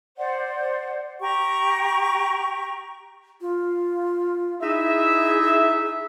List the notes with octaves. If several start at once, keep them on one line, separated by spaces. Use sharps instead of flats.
C5 D5 F#5
G4 A#5 C#6
F4
D#4 E4 G#4 E5